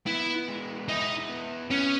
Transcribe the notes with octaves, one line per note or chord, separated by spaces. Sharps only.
B3 E4
G#3
D#4 E4
B3
B3 C#4